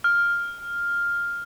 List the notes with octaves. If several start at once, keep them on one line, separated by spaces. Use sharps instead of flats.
F6